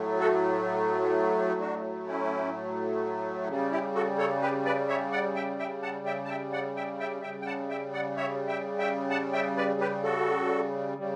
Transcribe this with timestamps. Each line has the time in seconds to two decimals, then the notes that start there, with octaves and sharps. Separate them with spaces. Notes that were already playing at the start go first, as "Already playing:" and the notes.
Already playing: A2 F#3 A3
0.20 F#4 A4
1.60 D4 F#4
2.07 C#4 E4
3.48 C#3 G3
3.72 E4 G4
3.95 F#4 A4
4.18 A4 C#5
4.42 G4 B4
4.65 B4 D5
4.89 C#5 E5
5.12 D5 F#5
5.35 E5 G5
5.59 E5 G5
5.82 F#5 A5
6.06 E5 G5
6.25 A5
6.29 E5 G5
6.52 D5 F#5
6.76 E5 G5
7.00 E5 G5
7.22 C#3 E5 G5
7.27 G3
7.41 G5
7.46 F#5 A5
7.70 E5 G5
7.93 D5 F#5
8.17 C#5 E5
8.48 E5 G5
8.79 E5 G5
9.10 F#5 A5
9.33 E5 G5
9.57 B4 D5
9.80 G4 B4
10.04 F#4 A4
10.98 C#3 G3